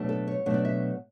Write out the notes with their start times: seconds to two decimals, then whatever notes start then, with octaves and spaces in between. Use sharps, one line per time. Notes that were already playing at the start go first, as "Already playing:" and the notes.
Already playing: B2 F#3 A3 D4
0.09 A4
0.28 C#5
0.46 B2 F#3 A3 D4
0.54 D5
0.65 E5